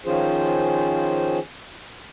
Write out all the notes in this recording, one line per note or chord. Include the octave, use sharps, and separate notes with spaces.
D#3 F3 C#4 F4 G#4 C5